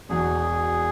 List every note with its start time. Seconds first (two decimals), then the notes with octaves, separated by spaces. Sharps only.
0.09 E1 E2 B2 G#4